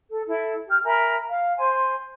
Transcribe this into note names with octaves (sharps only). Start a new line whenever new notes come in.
A4
E4 A4
G4 F6
A#4 E5 G#5 B5
F5
C5 G#5 C6